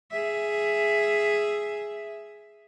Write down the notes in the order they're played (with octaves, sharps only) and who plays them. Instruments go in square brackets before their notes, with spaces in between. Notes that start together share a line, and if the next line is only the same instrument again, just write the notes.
[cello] G#4 E5